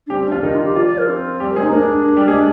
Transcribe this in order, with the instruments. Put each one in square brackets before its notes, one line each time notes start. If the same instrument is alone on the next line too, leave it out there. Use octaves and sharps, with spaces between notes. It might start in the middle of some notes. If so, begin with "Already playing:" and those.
[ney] D4
[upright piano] G3 G4 [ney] C4
[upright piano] G3 G4
[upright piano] F3 F4 [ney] D4
[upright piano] D#3 D#4 [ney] D4
[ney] F4
G4
[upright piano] F3 F4 [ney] D5
[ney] D5
A#4
C4
[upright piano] G3 G4
A#4
G#3 G#4
[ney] D#4
[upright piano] A#3 A#4 [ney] D4
[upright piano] G3 G4
G#3 G#4